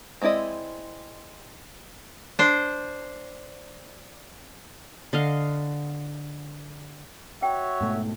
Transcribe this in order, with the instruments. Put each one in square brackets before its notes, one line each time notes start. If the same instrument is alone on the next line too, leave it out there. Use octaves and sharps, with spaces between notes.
[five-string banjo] G#3 C4 E4 D5 D#5
[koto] D4 C5
[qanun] D3 D#5 F5
[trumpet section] F#4 C#5 E5 [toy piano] G5
[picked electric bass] G#2 B2 A3